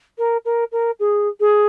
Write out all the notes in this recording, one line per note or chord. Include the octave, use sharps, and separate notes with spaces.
A#4
A#4
A#4
G#4
G#4